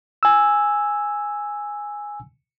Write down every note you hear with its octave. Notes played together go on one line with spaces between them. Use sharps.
G#5 E6